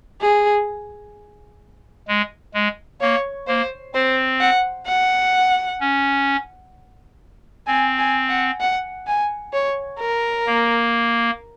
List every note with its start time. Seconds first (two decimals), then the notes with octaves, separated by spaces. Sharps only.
0.21 G#4
2.08 G#3
2.54 G#3
3.01 A#3 C#5
3.48 A#3 C5
3.94 C4 C5
4.41 F#5
4.87 F#5
5.81 C#4
7.67 C4 G#5
7.99 G#5
8.29 F#5
8.60 F#5
9.07 G#5
9.53 C#5
10.00 A#4
10.47 A#3